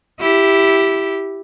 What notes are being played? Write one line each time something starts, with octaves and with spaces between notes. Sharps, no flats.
E4 G4